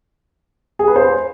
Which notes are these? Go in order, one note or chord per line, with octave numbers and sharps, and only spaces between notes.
G#4
B4
C5